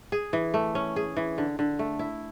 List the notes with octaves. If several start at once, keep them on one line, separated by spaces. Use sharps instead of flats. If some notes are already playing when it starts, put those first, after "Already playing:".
G#4
E3
A3
C#4
G#4
E3
D3
D3
A3
E4